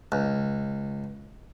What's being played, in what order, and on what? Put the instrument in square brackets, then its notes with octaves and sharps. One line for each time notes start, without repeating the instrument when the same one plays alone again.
[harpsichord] C#2